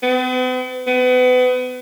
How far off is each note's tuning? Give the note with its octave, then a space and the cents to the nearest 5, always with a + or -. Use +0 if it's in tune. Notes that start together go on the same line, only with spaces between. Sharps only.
B3 +45
B3 +35